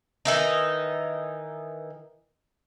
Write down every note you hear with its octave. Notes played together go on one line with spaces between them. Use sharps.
D#3 E3 D#4